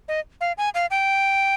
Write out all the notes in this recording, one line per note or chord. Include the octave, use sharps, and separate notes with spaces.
D#5
F5
G#5
F5
G5